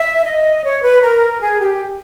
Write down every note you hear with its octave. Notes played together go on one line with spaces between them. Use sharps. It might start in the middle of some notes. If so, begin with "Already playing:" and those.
Already playing: E5
D#5
C#5
B4
A#4
G#4
G4